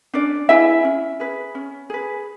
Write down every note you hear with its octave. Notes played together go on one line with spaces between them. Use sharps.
C#4 D4 D5
E4 G#4 B4 E5
C#4
G#4 B4
C#4
G#4 B4